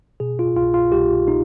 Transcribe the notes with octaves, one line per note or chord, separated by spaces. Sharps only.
B2 G#4
F4
C2 F4
F4
C2 G4
D#4